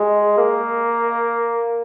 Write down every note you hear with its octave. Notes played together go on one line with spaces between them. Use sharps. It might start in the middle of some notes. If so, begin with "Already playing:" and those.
Already playing: G#3
A#3